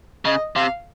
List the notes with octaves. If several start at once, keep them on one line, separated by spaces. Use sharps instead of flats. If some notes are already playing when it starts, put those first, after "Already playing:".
C#3 D#5
C3 F5